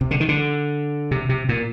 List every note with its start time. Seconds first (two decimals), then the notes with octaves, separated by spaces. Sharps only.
0.01 C3
0.11 D3
0.20 D#3
0.29 D3
1.11 C3
1.29 C3
1.49 A#2